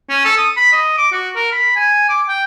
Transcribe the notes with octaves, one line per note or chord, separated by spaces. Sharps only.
C#4
A4
D#6
B5
D#5
D6
F#4
A#4
B5
G#5
D6
G5